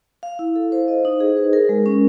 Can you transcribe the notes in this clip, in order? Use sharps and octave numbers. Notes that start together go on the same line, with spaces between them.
F5
E4
A4
C5
D#5
D#4
G#4
B4
A#4
G#3
C#4